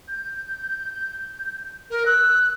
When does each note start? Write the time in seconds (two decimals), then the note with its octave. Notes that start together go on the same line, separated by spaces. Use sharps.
0.08 G6
1.90 A#4
2.06 E6 F#6